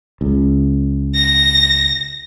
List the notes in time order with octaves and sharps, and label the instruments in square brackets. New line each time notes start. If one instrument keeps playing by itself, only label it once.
[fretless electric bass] C#2
[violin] A#6